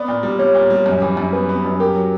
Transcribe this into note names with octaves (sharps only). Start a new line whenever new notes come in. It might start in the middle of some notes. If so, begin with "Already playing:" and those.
Already playing: B3 D5
A#2
G3
G3 C#5
A#2
G3
F#2
E3
F#2
B3 B4
B3
F#2
G4 A#4
F#3